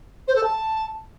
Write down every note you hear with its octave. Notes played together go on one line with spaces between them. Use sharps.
C5
A4
A5